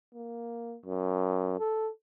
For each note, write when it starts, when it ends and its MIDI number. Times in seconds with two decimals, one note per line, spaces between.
0.14 0.76 58
0.86 1.59 42
1.59 1.89 69